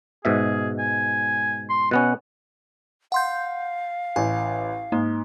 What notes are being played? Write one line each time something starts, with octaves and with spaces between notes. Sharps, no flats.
G#2 B2 G#4 E5
G#5
C6
B2 B3 C#4 F#5
F5 F#5 C6 G6
A1 G#5
G#2 A#3